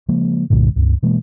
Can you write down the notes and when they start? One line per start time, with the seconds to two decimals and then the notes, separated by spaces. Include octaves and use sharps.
0.08 C#3 F3 G#3 A#3
0.50 C2 G2 A#2 D3
0.76 C#2 G2
1.03 B2 E3 G#3 A#3